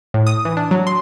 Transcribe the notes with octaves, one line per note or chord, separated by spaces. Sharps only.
A2
D#6
E3
D4
F#3
C6